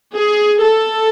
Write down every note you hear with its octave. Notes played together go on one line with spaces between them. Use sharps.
G#4
A4